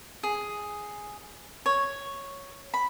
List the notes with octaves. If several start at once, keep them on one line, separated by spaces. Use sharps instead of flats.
G#4
C#5
B5